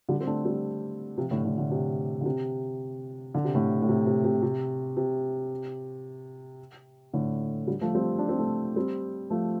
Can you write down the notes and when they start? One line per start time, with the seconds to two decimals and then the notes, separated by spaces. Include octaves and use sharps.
0.09 D3 G3
0.21 C4
0.27 A3 D4
0.45 G3 C4
1.17 C3 F3
1.31 A2 D3
1.44 A2 D3
1.58 A2 D3
1.71 C3
2.21 D3
2.25 C3
3.35 D3
3.44 C3
3.55 A2 D3
3.82 A2
3.89 C3
4.06 C3
4.24 C3
4.43 C3
4.97 C3
7.13 A2 D3
7.67 D3 G3
7.81 F3 A3
7.95 G3 C4
8.18 D4
8.29 C4
8.39 A3 D4
8.76 G3 C4
9.30 F3 A3